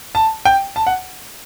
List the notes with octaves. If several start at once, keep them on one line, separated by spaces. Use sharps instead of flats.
A5
G5
A5
F#5